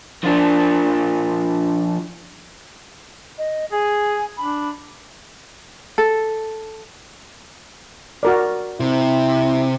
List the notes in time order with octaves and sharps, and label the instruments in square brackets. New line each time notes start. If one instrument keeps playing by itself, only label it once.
[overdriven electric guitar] F3 D4
[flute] D#5
[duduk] G#4 [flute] G#5
[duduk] D4 [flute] B5
[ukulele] A4
[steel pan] F#4 A#4 D5
[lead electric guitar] C3 [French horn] E4